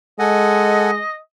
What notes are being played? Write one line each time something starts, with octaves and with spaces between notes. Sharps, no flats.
G#3 A4 D#5 F#5 G#5